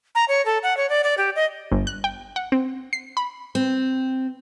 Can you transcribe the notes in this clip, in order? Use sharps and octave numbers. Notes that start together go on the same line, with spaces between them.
A#5
C#5
A4
F#5
C#5
D5
D5
G4
D#5
G1
F#6
G5
F#5
C4
C7
B5
C4